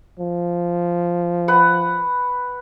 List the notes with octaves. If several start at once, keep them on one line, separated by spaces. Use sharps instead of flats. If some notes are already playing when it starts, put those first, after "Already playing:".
F3
B4 F#5